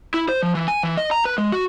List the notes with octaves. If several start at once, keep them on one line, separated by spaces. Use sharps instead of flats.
E4
C5
F3
E3
G#5
E3
D#5
A#5
B4
G#3
F#4